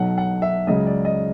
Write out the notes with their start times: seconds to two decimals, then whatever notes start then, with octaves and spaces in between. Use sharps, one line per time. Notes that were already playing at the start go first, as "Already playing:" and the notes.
Already playing: B1 B2 F#3 F#5
0.18 F#5
0.42 E5
0.67 C#2 C#3 F#3 D#5
0.86 D5
1.05 D#5